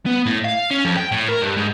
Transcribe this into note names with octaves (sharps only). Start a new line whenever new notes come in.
B3
A2
F5
C#4
F2
G5
A2
A#4
G2
G#2